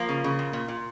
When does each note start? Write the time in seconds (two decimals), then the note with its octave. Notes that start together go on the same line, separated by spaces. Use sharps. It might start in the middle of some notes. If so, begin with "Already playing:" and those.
Already playing: F3 A#3
0.09 C#3
0.24 C#3
0.39 A#2
0.53 A#2
0.68 A#2